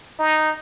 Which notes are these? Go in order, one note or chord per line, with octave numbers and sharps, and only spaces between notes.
D#4